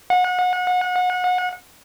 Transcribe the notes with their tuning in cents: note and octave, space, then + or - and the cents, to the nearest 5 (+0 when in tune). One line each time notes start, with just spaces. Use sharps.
F#5 -30